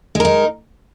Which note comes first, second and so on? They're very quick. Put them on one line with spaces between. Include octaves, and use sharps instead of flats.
G#3 A#4 D#4